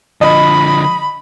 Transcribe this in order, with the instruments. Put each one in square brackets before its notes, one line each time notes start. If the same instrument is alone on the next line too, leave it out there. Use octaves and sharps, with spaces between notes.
[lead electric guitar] D3 F3 [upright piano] D#5 [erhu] B5